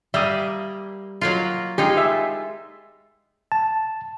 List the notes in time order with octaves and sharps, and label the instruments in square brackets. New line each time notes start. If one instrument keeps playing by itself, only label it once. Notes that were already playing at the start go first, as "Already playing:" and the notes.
[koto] G3 A#3 [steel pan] E5 D#6
[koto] F#3 A#3 F4
[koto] G#3 D#4 F4 [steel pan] G4
[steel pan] E5 G#5
[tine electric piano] A5